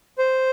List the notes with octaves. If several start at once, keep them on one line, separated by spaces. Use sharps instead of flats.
C5